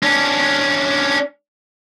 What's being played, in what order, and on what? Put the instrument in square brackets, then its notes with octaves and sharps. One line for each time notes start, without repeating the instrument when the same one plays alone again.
[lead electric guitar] C#4 D4